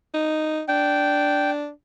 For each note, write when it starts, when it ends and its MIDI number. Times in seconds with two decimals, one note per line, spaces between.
0.14 0.61 63
0.68 1.69 62
0.68 1.51 79